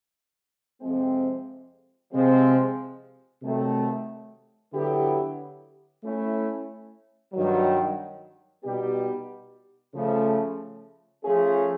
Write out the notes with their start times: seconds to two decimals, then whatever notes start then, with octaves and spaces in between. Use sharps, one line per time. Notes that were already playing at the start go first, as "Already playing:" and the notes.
0.81 F2 C3 F3 G#3 C4
2.12 C3 F3 G#3 C4
3.42 C3 D#3 F#3 A3
4.72 D3 F#3 B3 E4 G4
6.03 A3 C#4 E4
7.33 G2 D#3 F#3
8.64 B2 G3 B3 D#4 G4
9.94 C#3 F3 A3
11.24 F3 A3 C#4 F4 G#4